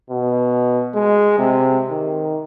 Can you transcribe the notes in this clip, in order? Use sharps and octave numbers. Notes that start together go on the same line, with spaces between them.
B2
G#3
C3
D#3